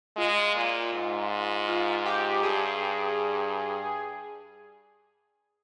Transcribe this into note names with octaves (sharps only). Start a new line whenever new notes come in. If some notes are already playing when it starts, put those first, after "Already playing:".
G#3 F4
A#2
G#2
F4
G4
G2 G#4